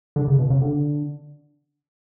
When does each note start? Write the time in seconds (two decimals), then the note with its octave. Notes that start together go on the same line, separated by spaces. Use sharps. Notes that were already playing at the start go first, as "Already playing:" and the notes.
0.16 D3
0.28 C#3
0.39 B2
0.50 C#3
0.62 D3